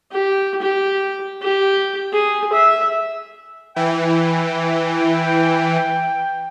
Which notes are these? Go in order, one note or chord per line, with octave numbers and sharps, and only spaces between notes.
G4
G4
G4
G#4
E5
E3 G5